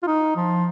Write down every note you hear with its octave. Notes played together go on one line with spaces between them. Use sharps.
F4
D#4
F3